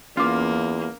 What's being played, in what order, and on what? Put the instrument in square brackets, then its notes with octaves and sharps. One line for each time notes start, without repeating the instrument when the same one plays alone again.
[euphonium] E2 [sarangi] A#3 [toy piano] C#4 D6 [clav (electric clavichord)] F4